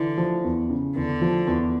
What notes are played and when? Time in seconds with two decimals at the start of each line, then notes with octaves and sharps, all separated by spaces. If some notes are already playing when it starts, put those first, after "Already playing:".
Already playing: D3 E3
0.18 F3
0.44 E2
0.70 C#3
0.95 E2 D3
1.21 F3
1.47 E2